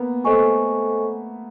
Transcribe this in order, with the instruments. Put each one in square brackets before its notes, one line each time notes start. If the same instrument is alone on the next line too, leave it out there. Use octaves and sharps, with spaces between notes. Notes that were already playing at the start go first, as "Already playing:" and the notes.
Already playing: [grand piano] A#3 B3
[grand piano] A3 [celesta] A4 C5 D#5 G#5 C#6